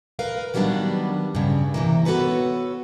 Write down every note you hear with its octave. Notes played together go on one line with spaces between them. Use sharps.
A#4 B4 F5
D#3 F#3 G3 B3 D4
G2 C#3
C3 E3 A#3
B3 F#4 A4 B4 C#5